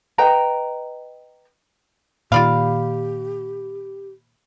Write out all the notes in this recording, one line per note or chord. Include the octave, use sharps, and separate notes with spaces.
B4 D#5 G5 A#5
A#2 D#3 F4 G4 D5 F5 B5